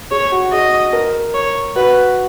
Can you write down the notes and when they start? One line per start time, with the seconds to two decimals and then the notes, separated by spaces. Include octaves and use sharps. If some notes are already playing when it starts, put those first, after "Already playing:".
0.11 G#4 C#5
0.32 F#4
0.52 G#4 D#5
0.93 A#4
1.34 C#5
1.75 F#4 B4